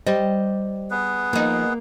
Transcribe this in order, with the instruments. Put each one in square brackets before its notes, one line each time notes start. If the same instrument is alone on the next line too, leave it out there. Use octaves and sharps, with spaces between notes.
[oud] G3 [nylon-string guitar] G4 C5 D#5
[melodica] B3 G#4 B4
[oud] F3 D#4 [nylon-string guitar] A#3